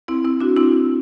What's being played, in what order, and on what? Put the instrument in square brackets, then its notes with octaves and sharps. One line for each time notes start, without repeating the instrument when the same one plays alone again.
[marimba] C4 E4
C4 E4
D4 F#4
C4 E4